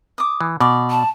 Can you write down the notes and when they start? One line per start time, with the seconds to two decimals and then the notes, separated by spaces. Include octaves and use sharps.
0.18 D6 D#6
0.41 E3
0.60 B2 D5 D6
0.90 A5